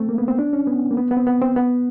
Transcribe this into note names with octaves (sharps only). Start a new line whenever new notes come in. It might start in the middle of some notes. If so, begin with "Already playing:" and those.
Already playing: A3 C4
A#3
B3
C4
D4
C#4
B3
A#3
B3
B3
C4
B3
C4
B3